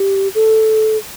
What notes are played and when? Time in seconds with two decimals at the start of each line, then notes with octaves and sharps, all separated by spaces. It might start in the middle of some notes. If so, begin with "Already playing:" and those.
Already playing: G4
0.35 A4